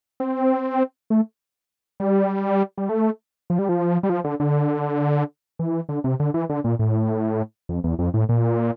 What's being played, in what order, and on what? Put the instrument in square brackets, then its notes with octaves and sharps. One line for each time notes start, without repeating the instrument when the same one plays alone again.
[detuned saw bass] C4
A3
G3
G3
A3
F3
G3
F3
G3
F3
D3
D3
E3
D3
C3
D3
E3
D3
A#2
A2
F2
E2
F2
A2
A#2